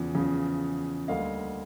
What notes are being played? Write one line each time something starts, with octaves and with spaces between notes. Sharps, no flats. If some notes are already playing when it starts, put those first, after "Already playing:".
Already playing: E2 C#3 F3
E2 C#3 F3
D2 D3 G3 A#3 D#5 F5